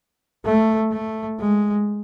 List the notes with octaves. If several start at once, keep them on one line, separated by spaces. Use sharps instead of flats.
A3
A3
G#3